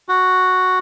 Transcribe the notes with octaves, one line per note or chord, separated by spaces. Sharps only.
F#4